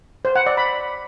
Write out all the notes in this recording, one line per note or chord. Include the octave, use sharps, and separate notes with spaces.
C5
F#5
D5
B5